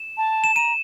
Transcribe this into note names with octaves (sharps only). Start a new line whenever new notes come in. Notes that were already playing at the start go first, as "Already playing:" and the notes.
Already playing: E7
A5
E7
A#5 D#7